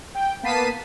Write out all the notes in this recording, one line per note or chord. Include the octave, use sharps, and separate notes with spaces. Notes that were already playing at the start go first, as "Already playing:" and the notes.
G5
A#3 B3 A5 B6 C7 D#7